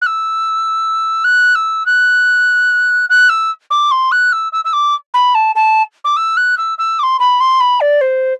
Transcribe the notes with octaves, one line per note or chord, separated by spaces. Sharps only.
F#6
E6
F#6
E6
F#6
F#6
E6
D6
C6
F#6
E6
E6
E6
D6
B5
A5
A5
D6
E6
F#6
E6
E6
D6
C6
B5
C6
B5
D5
C5